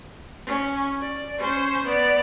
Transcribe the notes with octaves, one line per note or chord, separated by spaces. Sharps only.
C#4
D5
C#4 C5
B3 D5